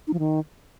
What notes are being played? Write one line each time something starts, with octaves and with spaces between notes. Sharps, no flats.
D#4
F3
D#3